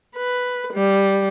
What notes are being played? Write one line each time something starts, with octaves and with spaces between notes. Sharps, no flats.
B4
G3